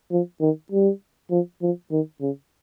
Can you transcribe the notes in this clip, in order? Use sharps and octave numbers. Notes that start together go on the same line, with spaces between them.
F3
D#3
G3
F3
F3
D#3
C#3